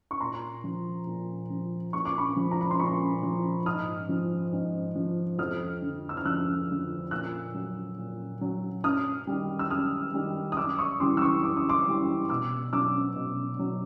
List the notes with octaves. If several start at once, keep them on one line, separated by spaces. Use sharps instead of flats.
C#6
A#2 A#5 C6
F3
A#2
F3
A#2 C#6
D6
B5 C#6
F3
A#5
B5
C6
A#2 B5 C#6
F3
G#2 D#6 F6
F3
G#2
F3
F2 D#6 F6
D3 F3
E6
F6
F2 E6 F#6
D3 F3
A#2 E6 F#6
F#3
A#2
F#3
F#2 D#6 F6
D#3 G3
E6
F#2 D#6 F6
D#3 G3
D#6
F#2 D6 E6
C#6 D#6
C#3 E3 G3 C6 D6
E6
C#6 D#6
F#2 D6
D#6
C6 D6
C#3 E3 G3
B2 D6 E6
F#3 D6 E6
B2
F#3